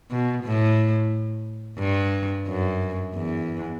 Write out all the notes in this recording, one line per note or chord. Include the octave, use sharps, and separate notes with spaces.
B2
A2
G2
F#2
E2